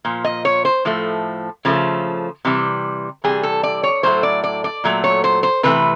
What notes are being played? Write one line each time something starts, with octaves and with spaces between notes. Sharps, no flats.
A#2 F3
D#5
C#5
C5
A2 F3 A3
C#3 F3 A3
C3 E3 G3
C3 E3 G3 G#4
A4
D5
C#5
A2 F#3 A3 C5
D5
D5
D5
A#2 F#3 A3
C#5
C5
C5
C3 E3 A3 B4